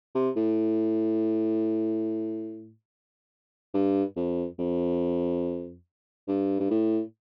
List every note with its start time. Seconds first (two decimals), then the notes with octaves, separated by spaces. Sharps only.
0.15 C3
0.36 A2
3.74 G2
4.16 F2
4.59 F2
6.28 G2
6.59 G2
6.71 A2